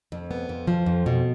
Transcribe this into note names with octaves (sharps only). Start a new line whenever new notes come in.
F2
B3
F2
F3
F2
B2